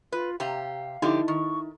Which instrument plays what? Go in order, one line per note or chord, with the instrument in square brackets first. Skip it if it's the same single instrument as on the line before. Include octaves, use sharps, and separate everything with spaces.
[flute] F4 [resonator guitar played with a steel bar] B4
[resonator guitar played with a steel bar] C3 G4 A#5 [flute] F5
[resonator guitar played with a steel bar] D3 F3 G4 [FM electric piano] D#4 E4
[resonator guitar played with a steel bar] D#3 [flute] C#6